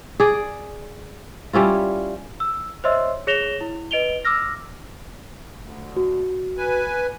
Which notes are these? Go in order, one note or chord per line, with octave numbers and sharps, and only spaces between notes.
G#4 D5
G3 C#4 E4 F4
E6
C5 C#5 D#5 E5 C6 E6
G#4 C#5 A#6 E7 F7 G7
E4
B4 D#5 D7 F7 G7
D6 E6 F6 A#6
D2
F#4
B4 G#5